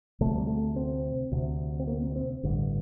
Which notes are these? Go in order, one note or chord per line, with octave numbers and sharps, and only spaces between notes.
D2 C3 A3
G3
A3
C4
D2 C3
C4
A#3
C4
C4
A1 G2 D3